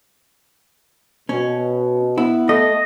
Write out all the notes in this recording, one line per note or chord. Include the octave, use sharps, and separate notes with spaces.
B2 C#4
B3 E4
A3 D#5